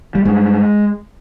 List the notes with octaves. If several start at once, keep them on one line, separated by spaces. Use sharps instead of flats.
G3
G2 G#3